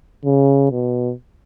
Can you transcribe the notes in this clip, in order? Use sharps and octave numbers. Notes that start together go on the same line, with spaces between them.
C#3
B2